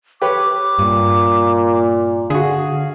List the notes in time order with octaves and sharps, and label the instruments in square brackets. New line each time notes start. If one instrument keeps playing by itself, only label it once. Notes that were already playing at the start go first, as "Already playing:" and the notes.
[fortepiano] G4 B4 C#5 [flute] D6
[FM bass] G2 [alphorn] A#2
[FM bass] D3 [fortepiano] F#4 G#4 [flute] F5